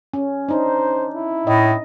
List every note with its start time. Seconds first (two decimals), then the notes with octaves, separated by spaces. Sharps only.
0.13 C#4
0.49 D4 D#4 C5
1.15 E4
1.47 A2 D#5